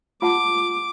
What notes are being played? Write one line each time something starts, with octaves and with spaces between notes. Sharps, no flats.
F4 F#5 A5 D6